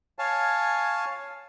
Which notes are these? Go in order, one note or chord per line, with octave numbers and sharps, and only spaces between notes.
C#5 F5 G#5 A5